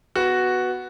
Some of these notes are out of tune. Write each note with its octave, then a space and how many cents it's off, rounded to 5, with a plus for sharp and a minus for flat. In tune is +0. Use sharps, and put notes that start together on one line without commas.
B3 +0 F#4 +0